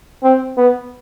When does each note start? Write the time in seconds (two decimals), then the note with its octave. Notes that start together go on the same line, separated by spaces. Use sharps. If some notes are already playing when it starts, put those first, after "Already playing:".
0.23 C4
0.57 B3